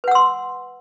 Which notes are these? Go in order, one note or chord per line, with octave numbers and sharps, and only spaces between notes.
B4 F#5 C6 E6